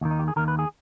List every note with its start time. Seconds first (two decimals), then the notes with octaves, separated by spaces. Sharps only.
0.01 D#2 D#3
0.11 D#4
0.19 G4
0.28 G#4
0.36 D#2 D#3 A#4
0.48 B4
0.59 G#4